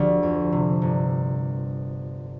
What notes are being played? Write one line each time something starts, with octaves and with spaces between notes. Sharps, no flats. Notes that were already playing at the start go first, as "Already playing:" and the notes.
Already playing: D2 D3 F3 G4
F2
C3
G1